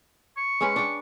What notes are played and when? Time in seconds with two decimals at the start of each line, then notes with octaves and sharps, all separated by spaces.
0.37 C#6
0.61 G#3 C#4 B4
0.76 D4 G5